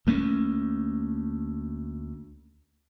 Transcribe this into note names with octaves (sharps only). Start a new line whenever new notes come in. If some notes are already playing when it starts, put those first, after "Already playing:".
D2 A3 A#3 C#4